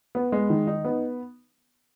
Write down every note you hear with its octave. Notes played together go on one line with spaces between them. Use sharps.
B3
G#3
D#3
D#4
B3